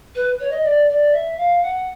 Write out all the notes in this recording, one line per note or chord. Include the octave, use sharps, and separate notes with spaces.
B4
C#5
D#5
D5
D5
E5
F5
F#5